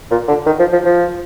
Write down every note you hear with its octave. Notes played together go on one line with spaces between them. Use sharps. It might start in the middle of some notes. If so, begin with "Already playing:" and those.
A#2
D3
D#3
F3
F3
F3